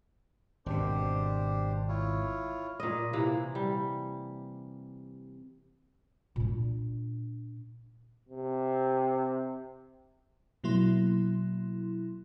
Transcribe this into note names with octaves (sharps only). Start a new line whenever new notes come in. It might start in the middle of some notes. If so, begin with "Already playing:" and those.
G#1 B2 D4 G4 C5
E4 F4 C#5
A#2 D#5
C3 E3 A#3
G3
A#2 D4
C3
B2 F#3 A#3 E4 C6